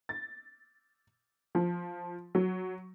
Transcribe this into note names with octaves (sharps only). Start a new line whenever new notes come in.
A6
F3
F#3